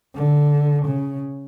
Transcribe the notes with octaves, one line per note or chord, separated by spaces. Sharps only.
D3
C#3